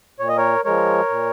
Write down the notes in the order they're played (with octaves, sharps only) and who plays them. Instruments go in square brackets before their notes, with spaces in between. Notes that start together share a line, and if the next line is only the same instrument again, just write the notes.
[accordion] A#2 C#5
D#5
A#4 C#5
F3 G#3 A#4 C#5
A#2